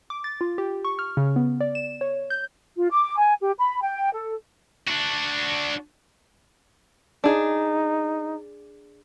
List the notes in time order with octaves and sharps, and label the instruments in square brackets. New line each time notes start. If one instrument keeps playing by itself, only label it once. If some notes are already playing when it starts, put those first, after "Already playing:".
[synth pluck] D6
A6
F4
G4
C#6
F6
C#3
B3
D5
E7
C#5
G6
[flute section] F4
D6
G#5
G4
B5
G5
A4
[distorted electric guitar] D4 F#4
[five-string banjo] D4 G#4 [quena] D#4